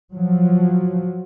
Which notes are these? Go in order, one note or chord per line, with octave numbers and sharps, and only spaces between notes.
F3 F#3